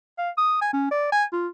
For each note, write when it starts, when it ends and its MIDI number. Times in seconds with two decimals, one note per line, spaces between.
0.18 0.30 77
0.38 0.59 87
0.62 0.69 80
0.73 0.89 61
0.91 1.10 74
1.12 1.25 80
1.33 1.48 65